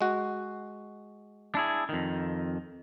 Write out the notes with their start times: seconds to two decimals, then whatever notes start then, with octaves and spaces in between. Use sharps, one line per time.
0.01 G#3 F#4
1.55 D4 E4 G#4
1.89 F2 D#3